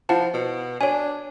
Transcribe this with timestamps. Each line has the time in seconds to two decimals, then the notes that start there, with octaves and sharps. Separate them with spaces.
0.09 F3 E4 F#5 A5
0.34 B2
0.81 D4 C#5 G#5